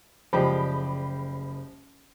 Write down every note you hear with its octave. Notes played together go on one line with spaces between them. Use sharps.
F#1 F3 G#3 G4 D5 B5